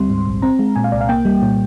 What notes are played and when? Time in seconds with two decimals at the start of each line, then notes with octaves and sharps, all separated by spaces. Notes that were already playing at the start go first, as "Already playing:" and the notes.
Already playing: D2 G3 C4 C6
0.09 G#2
0.27 A#1
0.42 C4 A#5
0.59 G#3
0.76 A#2 G#5
0.84 F5
0.92 C2 D5
1.01 F5
1.09 A#3 G5
1.25 G3
1.42 A#2